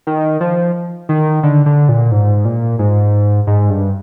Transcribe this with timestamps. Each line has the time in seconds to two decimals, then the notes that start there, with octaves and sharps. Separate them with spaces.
0.07 D#3
0.41 F3
1.09 D#3
1.43 D3
1.66 D3
1.89 A#2
2.12 G#2
2.45 A#2
2.79 G#2
3.47 G#2
3.70 G2